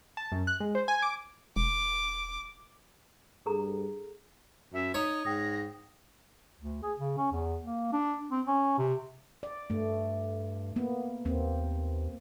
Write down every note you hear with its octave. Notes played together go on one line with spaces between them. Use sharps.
A5
F#2
F#6
G#3
C5
G#5
D6
E1 D6
G2 G#4 A4 A#5
F#2 E5
D#4 C#5 D#6
G#2 G5 D#6 A#6
D2
G#4
C#3
C#4
E2
A#3
D4
C4
C#4
C3
D5
G2 A3
A#3 B3
D#2 A#3 C4